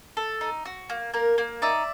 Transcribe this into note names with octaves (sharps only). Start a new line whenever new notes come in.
A4
D#4
F#4
A#3
A#3 A#4
A#3
D#4 D5 E5